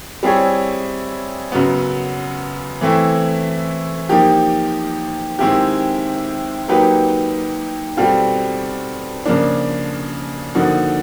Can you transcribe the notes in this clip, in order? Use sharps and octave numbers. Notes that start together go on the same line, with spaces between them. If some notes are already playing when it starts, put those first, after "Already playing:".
G3 C4 E4 G#4 C#5
F#2 C#3 F#3 B3
E3 A3 C4 E4
F3 A#3 D#4 G4
D#3 G#3 C4 E4 G4
F#3 A#3 D#4 G4 B4
B2 G3 C4 F4 A4
C#3 F3 A#3 D4
D3 F3 A#3 D#4 F#4